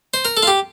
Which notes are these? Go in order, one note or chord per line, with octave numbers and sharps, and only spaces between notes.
C5
A#4
A4
F4
G4